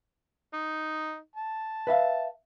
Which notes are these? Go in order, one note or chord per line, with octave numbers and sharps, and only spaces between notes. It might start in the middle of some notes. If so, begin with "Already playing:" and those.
D#4
A5
B4 E5 F5